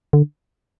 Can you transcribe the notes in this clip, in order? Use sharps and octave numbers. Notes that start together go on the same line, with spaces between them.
D3